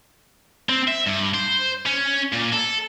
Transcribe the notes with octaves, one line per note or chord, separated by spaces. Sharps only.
C4
E5
G2
C5
C#4
A#2
A4